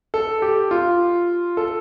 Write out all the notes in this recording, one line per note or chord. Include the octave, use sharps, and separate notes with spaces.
A4
G4
F4
A4